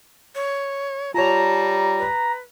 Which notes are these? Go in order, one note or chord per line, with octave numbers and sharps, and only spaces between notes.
C#5
G3 F4 C#5 A5 A#5
B4